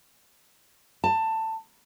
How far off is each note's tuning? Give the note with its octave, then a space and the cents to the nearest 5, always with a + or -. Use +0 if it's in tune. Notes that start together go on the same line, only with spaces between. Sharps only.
A5 +15